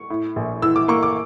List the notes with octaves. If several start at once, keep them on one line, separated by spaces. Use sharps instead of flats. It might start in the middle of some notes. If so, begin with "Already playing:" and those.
Already playing: C#6
A2
A#1
E3 E6
D6
A#3 C#6
D6